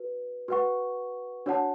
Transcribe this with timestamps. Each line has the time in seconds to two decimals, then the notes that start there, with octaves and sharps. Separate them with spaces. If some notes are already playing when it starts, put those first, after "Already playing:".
Already playing: F#4 B4
0.48 F#4 B4 F#5 C#6
1.46 D4 F#4 C#5 F#5 A5